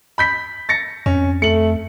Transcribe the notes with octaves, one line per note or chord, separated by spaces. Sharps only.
B5 G6 B6
A6 A#6 C#7
F2 C#4
A3 C#7 F#7